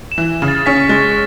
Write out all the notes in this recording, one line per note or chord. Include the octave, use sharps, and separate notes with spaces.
E7
E3
E7
C#3
A6
C#4 B6
G#3 A6